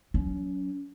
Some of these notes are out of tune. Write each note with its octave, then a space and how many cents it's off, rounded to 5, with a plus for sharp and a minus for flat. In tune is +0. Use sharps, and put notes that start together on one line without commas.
F#3 +0 C#4 +30